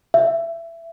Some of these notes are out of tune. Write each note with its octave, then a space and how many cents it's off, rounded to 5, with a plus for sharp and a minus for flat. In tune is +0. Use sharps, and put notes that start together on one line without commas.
E5 +20